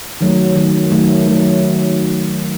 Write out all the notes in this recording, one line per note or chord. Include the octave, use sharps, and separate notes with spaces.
D#3 F#3 A3
D#3 F#3 A3
D#3 F#3 A3
D#3 F#3 A3